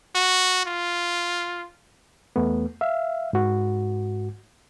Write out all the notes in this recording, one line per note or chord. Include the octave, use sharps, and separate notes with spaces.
F#4
F4
E2 A3 B3
E5 F5
G#2 F#4